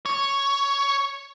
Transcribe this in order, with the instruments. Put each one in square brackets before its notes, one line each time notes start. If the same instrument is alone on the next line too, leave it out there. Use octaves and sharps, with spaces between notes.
[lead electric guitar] C#5